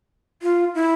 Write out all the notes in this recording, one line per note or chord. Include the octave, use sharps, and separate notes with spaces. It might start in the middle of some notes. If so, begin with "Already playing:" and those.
F4
E4